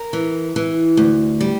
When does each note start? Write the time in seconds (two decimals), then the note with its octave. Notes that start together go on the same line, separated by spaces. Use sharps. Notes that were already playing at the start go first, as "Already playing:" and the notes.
Already playing: A#4
0.13 E3
0.56 E3
0.97 D2
1.41 G3